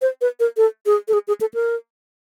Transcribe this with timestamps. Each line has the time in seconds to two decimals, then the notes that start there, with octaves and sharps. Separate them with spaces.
0.02 C5
0.21 B4
0.40 A#4
0.57 A4
0.86 G#4
1.08 A4
1.13 G#4
1.28 G#4
1.41 A4
1.54 A#4